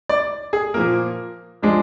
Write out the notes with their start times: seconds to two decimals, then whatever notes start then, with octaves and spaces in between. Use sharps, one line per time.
0.09 D5
0.53 G#4
0.74 A#2 F3 A#3 A#4
1.63 F3 G#3 D4